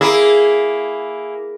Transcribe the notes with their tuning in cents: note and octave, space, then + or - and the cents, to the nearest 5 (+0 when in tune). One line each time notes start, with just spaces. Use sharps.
A#3 +0 E4 +0 G#4 +0